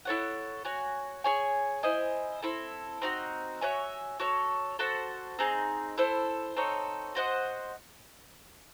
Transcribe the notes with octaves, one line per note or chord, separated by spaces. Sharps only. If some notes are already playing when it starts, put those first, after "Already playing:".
E4 A4 C#5 F#5
F#4 C#5 G#5
G#4 C#5 G#5
E4 C5 D#5 G#5
C4 E4 A4
C4 D#4 F#4
F#4 C#5 E5 G#5
F#4 A4 C#5
F#4 A4 C5 F#5
C4 D#4 G#4
E4 A4 C5
C4 D#4 A4 C#5
F#4 C5 D#5 F#5